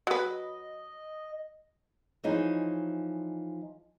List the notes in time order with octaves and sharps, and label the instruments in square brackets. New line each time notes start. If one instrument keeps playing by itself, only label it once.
[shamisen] F#3 B4 [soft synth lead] D#5
[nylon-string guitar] E3 F3 D#4 G#4 C#5